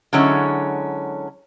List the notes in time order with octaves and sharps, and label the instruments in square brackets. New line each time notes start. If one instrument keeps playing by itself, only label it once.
[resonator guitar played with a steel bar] D3 F#3 G#3 C#4 E4